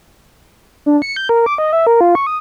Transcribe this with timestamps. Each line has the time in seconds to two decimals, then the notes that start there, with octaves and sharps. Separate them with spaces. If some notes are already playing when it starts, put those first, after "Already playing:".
0.86 D4
1.02 C#7
1.16 G6
1.29 A#4
1.46 D6
1.58 D#5
1.73 E5
1.87 A#4
2.01 F4
2.15 C#6
2.27 D#6